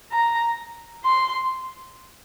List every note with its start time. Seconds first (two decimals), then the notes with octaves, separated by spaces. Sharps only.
0.13 A#5
1.05 C6